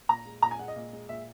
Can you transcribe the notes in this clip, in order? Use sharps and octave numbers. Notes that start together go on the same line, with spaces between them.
A#2 A#5
G#3
A#2 A#5
G#5
G#3 F#5
D#5
A#2
G#3
A#2 E5